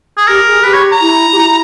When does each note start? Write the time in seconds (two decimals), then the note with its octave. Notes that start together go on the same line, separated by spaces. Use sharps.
0.18 G#4
0.28 G4 A#4
0.47 G#4
0.64 G4 B4
0.74 C#5
0.92 A#5
1.01 E4
1.32 G4
1.37 E4